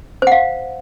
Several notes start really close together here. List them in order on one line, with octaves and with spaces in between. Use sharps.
C5 F#5 F5